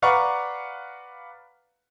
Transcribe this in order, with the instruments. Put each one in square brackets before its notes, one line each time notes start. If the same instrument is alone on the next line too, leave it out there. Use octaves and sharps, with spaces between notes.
[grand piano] B4 D5 F5 F#5 A#5 C#6